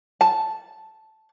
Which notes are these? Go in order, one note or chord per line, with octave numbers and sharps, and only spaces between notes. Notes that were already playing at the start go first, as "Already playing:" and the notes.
A5